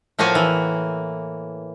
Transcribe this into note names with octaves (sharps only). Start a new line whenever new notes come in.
A2 F3 A#3 F#4 F5 G#5
E3